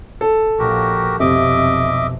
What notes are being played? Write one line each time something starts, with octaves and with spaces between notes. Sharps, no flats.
A4
A#1 F3 F#4 G4 A#4
B1 F2 C3 D#5 E5 D6